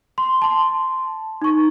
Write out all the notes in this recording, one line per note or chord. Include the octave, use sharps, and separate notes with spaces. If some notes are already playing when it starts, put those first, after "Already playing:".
C6
A5 C6
D#4 C#6